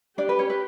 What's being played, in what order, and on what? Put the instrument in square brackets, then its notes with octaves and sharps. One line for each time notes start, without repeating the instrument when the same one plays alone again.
[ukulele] D4 D5 [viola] G4
[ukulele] B4
C#4 C#5
B4